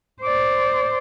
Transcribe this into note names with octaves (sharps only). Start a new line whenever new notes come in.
C5 D5